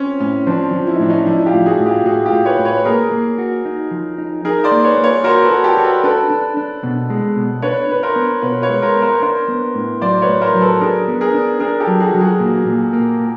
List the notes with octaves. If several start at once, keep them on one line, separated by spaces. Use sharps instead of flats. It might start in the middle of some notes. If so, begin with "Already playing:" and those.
Already playing: C4 C#4
A2 C#4
F3 C4 D4
F3
E4
D#4
A2 D4
C#4 D#4
F3 D4 E4
F4 G4
A2
F#4 G#4
A2
F4 G4
A2 F#4 G#4
F4 G4
A2
B4 C#5
A2
B4 C#5
A#3 G#4 A#4
A#3
F#4
D#4
F3
D#4
D#4 G#4 A#4
C5 D5
A#3
B4 C#5
A#3
B4 C#5
F#4 A#4 C5
A4 B4
F#4
G4 A4
F#4
A4 B4
D4 A4 B4
D4
D4
B2
G#3
B2
D4 B4 C#5
D4 B4
A#4 C5
B3
B2 B4 C#5
B4 C#5
G#3
A#4 C5
B3
A#4 C5
D4 A#4 C5
B3
A2
F#3 C5 D5
B4 C#5
A2
A#4 C5
F#3
A4 B4
D4 G#4 A#4
B3
G#4 A#4
D4
D4 G#4 A#4
G4 A4
F#3
F#4 G#4
F#3
F#4 G#4
A#2
A#2
A#3
A#2